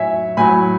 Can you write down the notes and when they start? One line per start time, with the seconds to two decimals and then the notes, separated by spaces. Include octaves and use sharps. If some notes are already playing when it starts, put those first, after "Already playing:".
Already playing: A2 F#3 C#5 E5 G#5
0.37 A2 F#3 G#5 B5